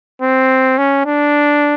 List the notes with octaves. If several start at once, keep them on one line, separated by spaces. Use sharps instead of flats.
C4
C#4
D4